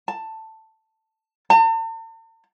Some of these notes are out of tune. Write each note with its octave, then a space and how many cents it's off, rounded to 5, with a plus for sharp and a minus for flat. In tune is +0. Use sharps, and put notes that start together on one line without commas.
A5 +10
A5 +45